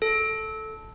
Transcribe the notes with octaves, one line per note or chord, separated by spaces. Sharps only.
A4